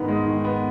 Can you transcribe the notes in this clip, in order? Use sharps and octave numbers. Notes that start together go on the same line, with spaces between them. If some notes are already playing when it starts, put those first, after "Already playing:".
Already playing: G#2 D#3 B3
G#3
D#3
B3